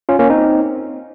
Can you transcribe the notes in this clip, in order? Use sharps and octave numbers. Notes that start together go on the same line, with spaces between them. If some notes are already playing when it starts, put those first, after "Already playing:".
C#4 F4
A#3 C#4
C4 D#4